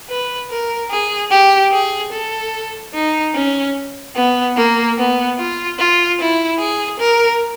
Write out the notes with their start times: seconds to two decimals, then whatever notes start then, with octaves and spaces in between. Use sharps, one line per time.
0.09 B4
0.50 A#4
0.90 G#4
1.31 G4
1.72 G#4
2.12 A4
2.94 D#4
3.35 C#4
4.15 B3
4.57 A#3
4.98 B3
5.38 F4
5.79 F4
6.20 E4
6.60 G#4
7.00 A#4